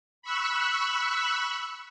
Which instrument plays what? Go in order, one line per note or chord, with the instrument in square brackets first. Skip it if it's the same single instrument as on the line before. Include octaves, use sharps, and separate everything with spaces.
[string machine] B5 C#6 E6 F#6